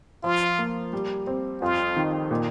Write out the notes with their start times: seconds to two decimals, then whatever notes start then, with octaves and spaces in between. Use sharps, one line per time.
0.23 F3 F4
0.59 A#3
0.93 G3
1.27 C4
1.61 F2 F4
1.96 D#3
2.31 A#2